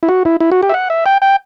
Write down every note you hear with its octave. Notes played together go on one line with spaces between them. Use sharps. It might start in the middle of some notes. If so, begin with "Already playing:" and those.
E4
F#4
E4
E4
F#4
G4
E5
F#5
E5
G5
G5